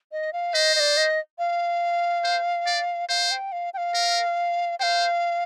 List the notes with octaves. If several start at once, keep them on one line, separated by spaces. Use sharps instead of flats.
D#5
F5
C5 D#5
D#5
D5
D#5
F5
C5
D5
C5 F5
G5
F5
G5
F5
A#4
C5 F5 G5